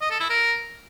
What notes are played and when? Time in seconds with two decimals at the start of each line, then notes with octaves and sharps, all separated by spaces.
0.01 D#5
0.11 A4
0.20 E4
0.30 A#4